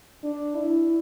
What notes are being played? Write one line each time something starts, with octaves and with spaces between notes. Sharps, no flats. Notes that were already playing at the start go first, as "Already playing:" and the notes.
D4
E4